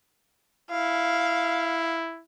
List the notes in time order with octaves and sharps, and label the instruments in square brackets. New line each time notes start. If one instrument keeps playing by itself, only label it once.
[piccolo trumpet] E4 [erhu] F5